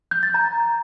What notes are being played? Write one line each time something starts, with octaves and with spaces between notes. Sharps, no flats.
G6
A6
A#5